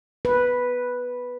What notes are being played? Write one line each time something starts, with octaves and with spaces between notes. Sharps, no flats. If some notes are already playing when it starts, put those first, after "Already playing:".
B4